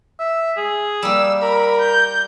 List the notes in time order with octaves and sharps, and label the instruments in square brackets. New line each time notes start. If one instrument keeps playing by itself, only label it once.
[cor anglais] E5
G#4
[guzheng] G3 A#3 [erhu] E6
[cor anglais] A#4 [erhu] B5
[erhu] G6